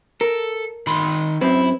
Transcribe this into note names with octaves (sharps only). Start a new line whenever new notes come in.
A4 A#4
D#3 B5 C6
F#2 C4 E4 B4